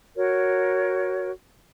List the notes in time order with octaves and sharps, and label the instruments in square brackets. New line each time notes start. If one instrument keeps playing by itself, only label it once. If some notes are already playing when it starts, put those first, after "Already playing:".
[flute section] F#4 A#4 C#5